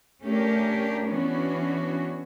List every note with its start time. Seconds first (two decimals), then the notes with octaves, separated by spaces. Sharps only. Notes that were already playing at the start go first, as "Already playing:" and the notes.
0.22 A3 C#4 D4 G4 A#4
1.08 E3 B3 C#4 D4 F#4